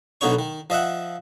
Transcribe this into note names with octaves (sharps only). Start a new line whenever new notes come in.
B1 B2 D3 D#4 C#5 C#6
D#3
F3 D#5 E5 F#5